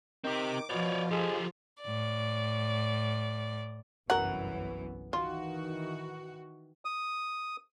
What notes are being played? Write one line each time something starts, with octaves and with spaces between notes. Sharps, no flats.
D#3 C4 G4 D6
B2 F3 F4 C#5 D5
G#3 G4 A4
A2 D5
G1 C2 F#2 E3 F#3 B3 A#4 F#5
D#3 E3 F4 F#4
D#6